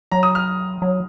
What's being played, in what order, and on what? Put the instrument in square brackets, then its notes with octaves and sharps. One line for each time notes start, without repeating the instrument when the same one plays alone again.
[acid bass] F#3 [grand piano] A#5
[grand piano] D#6
F6
[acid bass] F#3